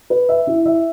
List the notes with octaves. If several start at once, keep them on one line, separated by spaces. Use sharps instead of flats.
B4
E5
E4
E5